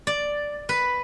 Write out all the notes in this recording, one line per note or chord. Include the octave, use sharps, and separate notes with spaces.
D5
B4